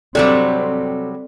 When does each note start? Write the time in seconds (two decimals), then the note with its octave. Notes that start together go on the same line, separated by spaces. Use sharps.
0.15 C3 F#3 G3 C4 A4 D5